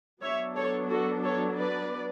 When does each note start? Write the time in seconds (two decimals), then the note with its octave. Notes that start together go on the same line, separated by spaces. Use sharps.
0.22 F#3 B3 D4 C#5 E5
0.56 A4 C#5
0.90 F#4 A4
1.24 A4 C#5
1.58 B4 D5